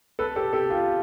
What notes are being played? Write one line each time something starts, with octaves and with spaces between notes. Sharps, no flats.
A4 B4
G4 A4
G4 A4
F4 G4